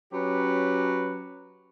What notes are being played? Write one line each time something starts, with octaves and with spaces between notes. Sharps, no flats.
F#3 C#4 G4 B4